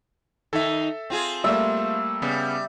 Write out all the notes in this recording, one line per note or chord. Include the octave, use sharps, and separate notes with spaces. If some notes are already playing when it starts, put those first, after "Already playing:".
D#3 D#4 A4 E5
C4 F4 G#4
G3 A3 A#3 E5
C#3 G3 B3